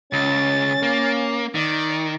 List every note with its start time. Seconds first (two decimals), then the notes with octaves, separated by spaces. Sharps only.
0.13 C#2 C#4 A6
0.83 A#3
1.55 D#3 D5